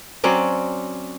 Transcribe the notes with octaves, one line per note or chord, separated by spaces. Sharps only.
F#3 C4 C#4 D5